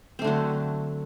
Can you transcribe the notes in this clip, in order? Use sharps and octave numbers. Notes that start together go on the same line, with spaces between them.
D3 F#3 A3 C4